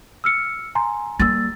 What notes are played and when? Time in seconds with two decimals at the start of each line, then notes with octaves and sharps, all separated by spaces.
0.24 E6 F6 C#7
0.75 G#5 A#5 C6
1.20 G3 A#3 E6 A6